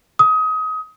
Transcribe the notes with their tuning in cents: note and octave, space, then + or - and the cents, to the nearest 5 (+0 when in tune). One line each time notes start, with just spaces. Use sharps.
D#6 +25